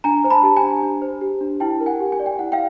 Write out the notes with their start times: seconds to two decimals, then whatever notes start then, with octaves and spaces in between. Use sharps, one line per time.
0.04 D4 G#5 A#5
0.24 C5 A#5
0.30 A5 B5
0.43 G4 A5
0.57 G#5 A#5
0.63 D4
0.83 D4
1.02 C5
1.21 G4
1.41 D4
1.60 E4 G5 A5
1.80 A#4
1.86 F#5 G#5
2.00 G4
2.12 G#5
2.19 D5
2.26 G5
2.39 E4 F#5
2.52 F5 G5